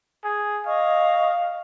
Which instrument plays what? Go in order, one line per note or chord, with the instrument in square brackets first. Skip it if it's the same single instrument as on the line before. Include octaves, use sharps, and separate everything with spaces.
[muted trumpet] G#4
[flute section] D#5 C#6 D#6 [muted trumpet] F5